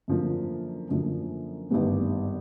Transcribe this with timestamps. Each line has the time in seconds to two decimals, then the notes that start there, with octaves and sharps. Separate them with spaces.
0.08 F#2 D3 F3 A#3
0.89 F#2 D3 F3 A#3
1.70 G#1 G2 D3 G3 B3